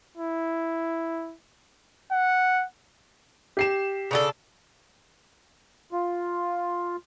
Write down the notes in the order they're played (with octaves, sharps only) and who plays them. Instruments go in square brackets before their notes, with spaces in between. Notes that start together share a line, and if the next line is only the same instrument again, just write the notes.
[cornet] E4
F#5
[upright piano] G4 C7 E7
[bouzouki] C#3 D4 A4
[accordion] F4